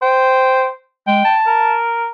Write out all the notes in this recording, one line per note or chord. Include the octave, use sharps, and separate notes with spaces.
C5 G5
G#3 G5
A5
A#4